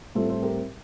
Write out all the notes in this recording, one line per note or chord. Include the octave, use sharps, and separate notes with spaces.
A2 G3 C4 F4 A4
A4 C5
G4 A#4